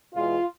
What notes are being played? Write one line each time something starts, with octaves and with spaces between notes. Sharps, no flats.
E2 B2 G#3 F4